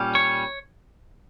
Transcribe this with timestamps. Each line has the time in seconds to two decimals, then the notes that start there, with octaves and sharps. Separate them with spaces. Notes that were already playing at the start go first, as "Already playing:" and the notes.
Already playing: A#2 G3 C#4
0.15 C#5